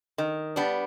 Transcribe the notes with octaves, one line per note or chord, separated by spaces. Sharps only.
D#3
G3 B3 D4